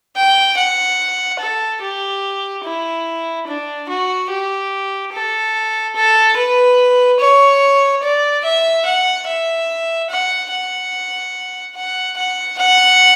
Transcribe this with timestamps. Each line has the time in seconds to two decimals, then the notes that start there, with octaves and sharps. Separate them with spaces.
0.16 G5
0.57 F#5
1.40 A4
1.82 G4
2.64 E4
3.47 D4
3.89 F#4
4.30 G4
5.13 A4
5.95 A4
6.36 B4
7.20 C#5
8.03 D5
8.45 E5
8.85 F#5
9.27 E5
10.10 F#5
10.51 F#5
11.76 F#5
12.17 F#5
12.58 F#5